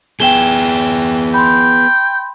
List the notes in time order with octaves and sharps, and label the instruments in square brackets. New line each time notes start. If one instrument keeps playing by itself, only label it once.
[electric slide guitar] B3 G#4 [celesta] G5 E7 G7
[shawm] G5 [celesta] B5 C6